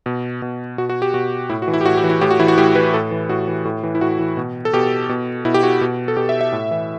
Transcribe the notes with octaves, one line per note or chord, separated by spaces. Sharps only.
B2
B2
B2 F#4
F#4
G4
B2 F#4
A2 E4
F#4
E3
E4
G4
A2 F#4
G4
E3
E4
A2 G4
F#4
E3 E4
F#4
A2 G4
E3 B4
A2 A4
E3
A2 F#4
E3
A2
E3
E4
A2 F#4
E3
B2
A4
B2 G4
B2
B2 E4
G4
F#4
B2
A4
B2 G4
E5
E5
A2
E3